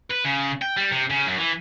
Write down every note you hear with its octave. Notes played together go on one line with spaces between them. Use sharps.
B4
C#3
G5
G3
C3
C#3
F#2
E3